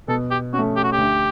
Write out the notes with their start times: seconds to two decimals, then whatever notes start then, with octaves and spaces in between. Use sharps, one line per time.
0.08 B2 A4
0.31 G4
0.53 C#4 F#4
0.59 A3
0.76 G4
0.84 F#4
0.92 G4
0.98 D2